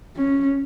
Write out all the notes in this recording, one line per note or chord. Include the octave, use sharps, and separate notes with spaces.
C#4